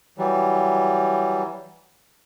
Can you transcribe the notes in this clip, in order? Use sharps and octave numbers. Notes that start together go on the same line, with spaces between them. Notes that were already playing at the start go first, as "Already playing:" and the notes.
E3 F#3 G3